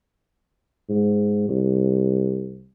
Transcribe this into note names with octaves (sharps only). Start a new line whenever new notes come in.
G#2
C2